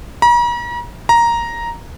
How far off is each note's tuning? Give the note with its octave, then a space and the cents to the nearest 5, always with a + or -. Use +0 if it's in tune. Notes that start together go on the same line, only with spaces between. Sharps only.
A#5 +45
A#5 +5